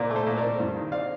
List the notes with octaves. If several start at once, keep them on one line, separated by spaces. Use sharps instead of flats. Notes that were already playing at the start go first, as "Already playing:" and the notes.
Already playing: A#2 C4 A#4 D5
A3
A4 C5
A#2
A#4 D5
C4
G2
D#3
C4 D5 F5